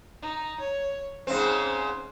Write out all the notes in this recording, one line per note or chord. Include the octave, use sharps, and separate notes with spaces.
D#4
C#5
G#2 C#3 C4 C5